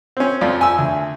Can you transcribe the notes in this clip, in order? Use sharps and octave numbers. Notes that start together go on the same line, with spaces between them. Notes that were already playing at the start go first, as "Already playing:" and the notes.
C4 C#4
F2 F3 D5
G#5 E6
D2